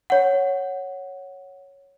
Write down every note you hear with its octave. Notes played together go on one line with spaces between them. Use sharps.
C#5 F#5